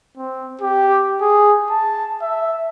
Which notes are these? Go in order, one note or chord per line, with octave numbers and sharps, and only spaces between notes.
C4
G4
G#4
A5
E5